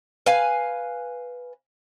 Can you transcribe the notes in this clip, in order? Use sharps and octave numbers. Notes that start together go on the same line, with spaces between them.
B4 F5 G#5